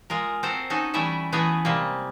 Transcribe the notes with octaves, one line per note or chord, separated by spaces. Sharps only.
G#3 F4 A#4
C4 F#4 A4 C5 A#5
C#4 D#4 F#4 A4
E3 G3 A3 C#4 E4 E5
E3 A3 B3 F#4 G#4 C#5
C3 G3 G#3 A#3